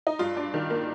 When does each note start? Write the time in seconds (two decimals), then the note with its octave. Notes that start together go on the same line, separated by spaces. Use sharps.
0.07 D#4
0.19 G2 F4
0.37 D4
0.54 D#3
0.70 A#3